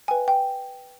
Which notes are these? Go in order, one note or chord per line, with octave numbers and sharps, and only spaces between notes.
B4 E5 G5 G#5
G5